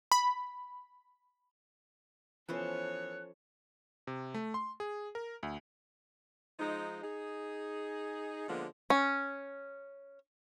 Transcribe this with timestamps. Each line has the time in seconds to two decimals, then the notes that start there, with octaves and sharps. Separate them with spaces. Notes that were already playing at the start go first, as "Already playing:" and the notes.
0.12 B5
2.49 E3 F3 B3 C#4 A4 C5 C#5 F#6
4.07 C3
4.34 A3
4.54 C6
4.80 G#4
5.15 A#4
5.43 D2
6.59 F3 G#3 D#4
7.03 D#4 G#4
8.49 D3 F3 G#3 A#3 B3
8.90 C#4